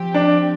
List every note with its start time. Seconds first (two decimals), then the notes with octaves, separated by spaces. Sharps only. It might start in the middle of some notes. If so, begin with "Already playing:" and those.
Already playing: F3 C4 G4
0.14 D4